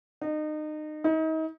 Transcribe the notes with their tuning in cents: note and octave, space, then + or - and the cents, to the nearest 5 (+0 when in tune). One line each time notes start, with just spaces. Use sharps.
D#4 -30
D#4 +35